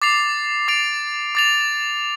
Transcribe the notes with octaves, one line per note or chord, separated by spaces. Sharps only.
D6 A6 C7 F7
D6 A6 D7 F7
D6 A6 F7